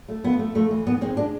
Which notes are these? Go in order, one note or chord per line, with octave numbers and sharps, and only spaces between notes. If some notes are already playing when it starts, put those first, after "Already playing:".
A3
F2 B3
A3
F2 A3
E3
G#2 B3
G#3 C4
G#3 D4